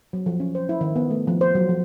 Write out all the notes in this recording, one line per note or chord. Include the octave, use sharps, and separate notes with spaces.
F#3
F3
C#4
C5
E4
D#3
B3
A3
F3
C5
F#3
F3